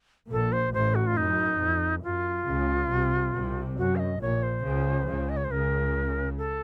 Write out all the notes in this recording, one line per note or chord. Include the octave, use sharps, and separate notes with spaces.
A#1 A#2 A4
C5
A1 A2 C5
F#4
F4
F#2 D#4
F2
F#2 F4
C#2 C#3
C2 C3
C2 C3
F#2 F#4
F5
D#5
A#1 A#2 C#5
C5
C#2 C#3
C#2 C#3
D#5
C#5
C5
C#2 C#3 A#4
A4